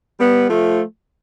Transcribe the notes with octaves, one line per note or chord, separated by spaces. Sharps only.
G3 B3
F3 A3